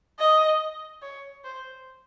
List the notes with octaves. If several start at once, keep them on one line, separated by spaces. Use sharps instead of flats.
D#5
C#5
C5